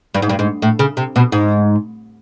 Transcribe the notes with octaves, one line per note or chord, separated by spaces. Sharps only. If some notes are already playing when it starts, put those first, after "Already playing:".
G2
G#2
G2
G#2
A2
C#3
C3
B2
G#2